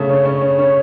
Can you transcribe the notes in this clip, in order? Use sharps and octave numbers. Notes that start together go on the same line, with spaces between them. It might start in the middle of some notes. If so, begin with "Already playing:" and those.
Already playing: C#3 A3
C#4
C#4
C#4
C#4